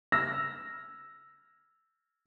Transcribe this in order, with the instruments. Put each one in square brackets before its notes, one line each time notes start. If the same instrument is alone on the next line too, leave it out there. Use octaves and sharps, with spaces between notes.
[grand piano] E6 F6 A#6